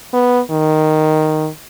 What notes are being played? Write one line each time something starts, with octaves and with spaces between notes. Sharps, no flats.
B3
D#3